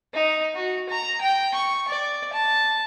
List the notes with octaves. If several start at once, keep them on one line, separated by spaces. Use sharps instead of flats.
D#4
F#4
A#5
G5
C#6
D5
A5